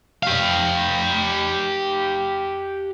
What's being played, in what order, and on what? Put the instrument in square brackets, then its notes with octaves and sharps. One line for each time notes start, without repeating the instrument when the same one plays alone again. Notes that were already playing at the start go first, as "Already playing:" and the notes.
[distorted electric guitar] G4 F5